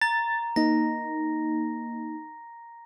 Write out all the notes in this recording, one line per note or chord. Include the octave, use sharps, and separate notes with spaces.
A#5 A6
A#3 D#4 A#6